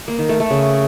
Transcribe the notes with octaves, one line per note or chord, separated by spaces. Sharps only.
A#3
D#3
A3
A3
C#3